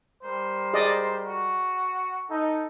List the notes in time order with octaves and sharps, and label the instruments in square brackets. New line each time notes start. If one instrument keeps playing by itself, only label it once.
[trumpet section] G3 A#4 [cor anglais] C5
[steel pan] G#4 D5 D#5
[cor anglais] F#4
[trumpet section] D#4 [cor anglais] A4